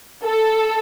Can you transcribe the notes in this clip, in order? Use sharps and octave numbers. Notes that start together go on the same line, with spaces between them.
A4